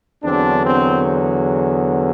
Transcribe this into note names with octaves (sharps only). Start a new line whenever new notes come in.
E2 D3 F#3 C4 D4
C4